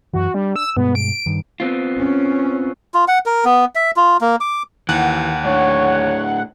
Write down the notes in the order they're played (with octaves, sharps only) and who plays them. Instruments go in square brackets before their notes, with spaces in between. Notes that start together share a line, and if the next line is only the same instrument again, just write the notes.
[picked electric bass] F#2 E3 [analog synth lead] F#4
[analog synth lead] G3 [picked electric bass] D4
[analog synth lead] E6
[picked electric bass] G2 B2 G#3 [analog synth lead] B3
[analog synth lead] D7
[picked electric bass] G2 D#3
[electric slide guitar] B3 C4 F4
[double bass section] C#4
[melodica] F4
F#5
A#4
B3
E5
F4
A#3
D6
[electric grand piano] D#2 [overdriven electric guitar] E3 [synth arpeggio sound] F#5
[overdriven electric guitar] A2 D4 [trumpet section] C#5